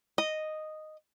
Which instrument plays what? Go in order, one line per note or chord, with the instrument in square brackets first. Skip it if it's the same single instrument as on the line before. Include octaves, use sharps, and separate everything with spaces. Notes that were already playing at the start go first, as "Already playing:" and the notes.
[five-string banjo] D#5